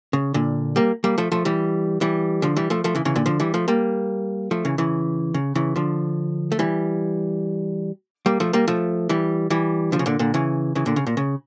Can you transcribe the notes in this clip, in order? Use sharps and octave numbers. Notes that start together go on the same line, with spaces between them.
C#3
A#2 D3
G3 A#3
G3 A#3
F3 A3
F3 A3
E3 G3
E3 G3
D3 F3
E3 G3
F3 A3
F3 A3
C#3 E3
C#3 E3
A#2 D3
D3 F3
E3 G3
F3 A3
G3 A#3
F3 A3
C#3 E3
C#3 E3
C#3
C#3 E3
D3 F3
A3
E3 G3
G3 A#3
F3 A3
G3 A#3
F3 A3
E3 G3
E3 G3
D3 F3
C#3
A#2 D3
A#2 D3
C#3 E3
C#3 E3
A#2 D3
C#3
A#2
C#3